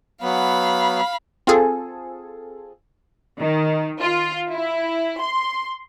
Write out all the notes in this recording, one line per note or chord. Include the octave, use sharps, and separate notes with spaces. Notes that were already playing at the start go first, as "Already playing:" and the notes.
F#3 B3 F5 B5
C4 F4 G#4 A4
D#3
F4
E4
C6